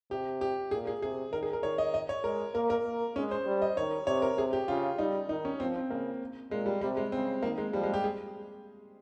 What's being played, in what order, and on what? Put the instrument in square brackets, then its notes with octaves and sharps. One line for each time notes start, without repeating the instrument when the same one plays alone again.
[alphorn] C3 [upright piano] G4
[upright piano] G4
[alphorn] A#2 [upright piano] G#4
[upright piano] G#4
[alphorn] C3 [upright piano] G#4
[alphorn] D#3 [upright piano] A#4
[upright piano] G#4
A#4
[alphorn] D#3 [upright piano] C#5
[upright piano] D#5
D#5
C#5
[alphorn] G#3 [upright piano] A#4
[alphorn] A#3 [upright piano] A#4
[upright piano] A#4
[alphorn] A#3
[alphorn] G#3 [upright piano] C#4
[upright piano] C5
[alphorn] G3
[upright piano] D#5
[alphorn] D#3 [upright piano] C#5
[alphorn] C3 [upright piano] C#5
[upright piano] A#4
[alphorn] C3 [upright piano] G#4
[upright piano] G4
[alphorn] C#3 [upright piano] F4
[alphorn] G3 [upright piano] D#4
[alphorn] D#3 [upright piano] D#4
[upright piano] C#4
[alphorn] F3 [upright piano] C4
[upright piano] C4
[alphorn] C#3 [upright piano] A#3
[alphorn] A#2 [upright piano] G#3
[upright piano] G3
[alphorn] C3 [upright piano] G3
[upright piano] G#3
[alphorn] C#3 [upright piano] C4
[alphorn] D#3 [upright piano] A#3
[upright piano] G#3
[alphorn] F3 [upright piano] G3
[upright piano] G#3
G4
G#4